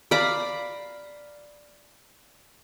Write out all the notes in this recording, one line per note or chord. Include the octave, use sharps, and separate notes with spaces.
D5 F5 A#5 B5